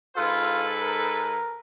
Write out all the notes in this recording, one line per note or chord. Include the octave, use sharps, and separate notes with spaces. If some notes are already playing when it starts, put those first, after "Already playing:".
G#2 F4 A4 B4
A#4